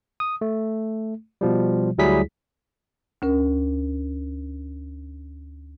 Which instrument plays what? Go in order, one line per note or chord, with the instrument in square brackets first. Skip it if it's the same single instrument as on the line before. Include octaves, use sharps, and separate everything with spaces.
[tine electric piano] D#6
A3
B2 F3 G3
D2 F#3 G3 E4 G#4 B6
[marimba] D2 C#4 A#4